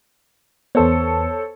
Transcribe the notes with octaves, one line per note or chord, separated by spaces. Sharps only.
E2 B3 A4 C5 C#5